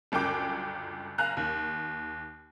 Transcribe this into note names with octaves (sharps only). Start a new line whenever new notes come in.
G1 C#2 F#2 G5 D6
F#1 F5 G#5 A#5 F#6
D#2